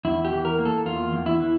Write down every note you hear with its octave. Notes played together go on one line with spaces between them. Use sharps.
E2 E4
G4
E3
A#4
A#3
A4
E2 F4
E2
E4
E3